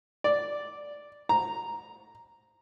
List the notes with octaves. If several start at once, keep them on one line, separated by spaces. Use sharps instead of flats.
D5
A#5